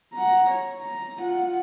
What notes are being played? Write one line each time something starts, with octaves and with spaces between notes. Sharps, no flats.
F#5 A#5
C#5
A#5
F4 F#5